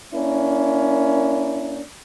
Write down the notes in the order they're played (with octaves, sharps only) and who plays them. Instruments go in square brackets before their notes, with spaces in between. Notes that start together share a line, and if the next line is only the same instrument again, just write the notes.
[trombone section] A#3 C#4 D4 E4 A#4